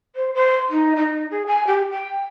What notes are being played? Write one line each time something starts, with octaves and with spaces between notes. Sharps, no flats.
C5
C5
D#4
D#4
G#4
G#5
G4
G5